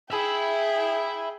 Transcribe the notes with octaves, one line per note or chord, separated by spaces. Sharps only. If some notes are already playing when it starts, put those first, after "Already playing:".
G#4 E5 G5 B5